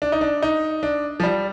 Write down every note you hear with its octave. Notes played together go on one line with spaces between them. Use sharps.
D4
D#4
D4
D#4
D4
F3
G3